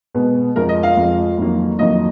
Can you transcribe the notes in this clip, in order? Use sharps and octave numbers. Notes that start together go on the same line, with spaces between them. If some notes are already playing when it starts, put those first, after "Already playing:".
B2 G#3 B3
F2 F3 G#3 A#4
D#5
F5
F2 F3 G#3
F2 D#3 F#3 A#3
F2 D#3 F#3 A#3 D#5